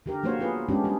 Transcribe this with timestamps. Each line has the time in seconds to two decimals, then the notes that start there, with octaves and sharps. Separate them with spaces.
0.06 D3 G4 A#4
0.23 F#3 A#3 F#4 C5 C#5
0.39 F#3 B3 F4 G#4 B4
0.69 G#3 B3 C#4 D4 G4
0.84 G3 D4 G#4